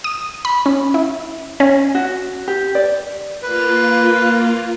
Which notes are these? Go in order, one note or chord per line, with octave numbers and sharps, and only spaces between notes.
D#6
B5
C#4
E4
C#4
F#4
G4
D5
A#3 F4 B4